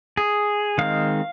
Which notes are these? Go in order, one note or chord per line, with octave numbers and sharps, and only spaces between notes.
G#4
D#3 G#3 C4 F5